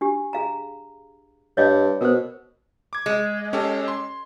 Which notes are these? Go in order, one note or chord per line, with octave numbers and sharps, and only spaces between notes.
D4 G4
G#4 F5 A#5
G2 C#5 D#5 F5
B2 A#4 C5
D6 G#6
G#3
C#4 G4 A4
C6